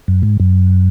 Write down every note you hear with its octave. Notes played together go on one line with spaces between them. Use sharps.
F#2
G#2
F#2